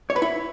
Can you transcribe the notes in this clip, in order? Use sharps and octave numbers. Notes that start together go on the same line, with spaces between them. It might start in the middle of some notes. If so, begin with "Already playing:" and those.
C#5
B4
E4